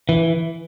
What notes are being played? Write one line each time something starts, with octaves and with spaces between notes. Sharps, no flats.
E3